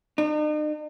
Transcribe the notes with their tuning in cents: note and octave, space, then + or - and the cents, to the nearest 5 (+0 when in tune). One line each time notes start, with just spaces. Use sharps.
D#4 -45